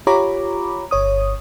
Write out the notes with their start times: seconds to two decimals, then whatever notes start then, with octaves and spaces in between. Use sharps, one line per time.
0.07 F4 G4 C#5 A#5 B5 D6
0.91 G1 C#5 D#6